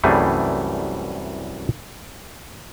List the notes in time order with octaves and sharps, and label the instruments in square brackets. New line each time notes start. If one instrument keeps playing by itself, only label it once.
[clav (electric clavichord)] C2 F#2 E3 G3 A3 G#4